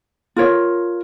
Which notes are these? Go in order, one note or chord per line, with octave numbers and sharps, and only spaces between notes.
F4 A#4 C#5